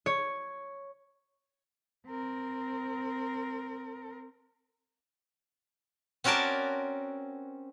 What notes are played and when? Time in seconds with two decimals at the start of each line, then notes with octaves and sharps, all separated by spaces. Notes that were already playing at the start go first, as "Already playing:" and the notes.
0.06 C#5
2.07 C4 A#4
6.24 C4 C#4 F#4 A#4 D5 A5